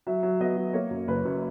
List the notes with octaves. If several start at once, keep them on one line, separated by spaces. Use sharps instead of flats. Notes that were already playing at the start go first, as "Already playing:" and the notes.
F#3 E5
F#3
B3 D#5
F#3
A#3 C#5
F#2
F#1 B4
F#2